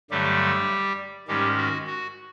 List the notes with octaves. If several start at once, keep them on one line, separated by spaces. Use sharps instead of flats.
G2 D3 F#3 G3 A3 G4
G#2 D#3 G3 G#3 C#4 G4
F#4
F#4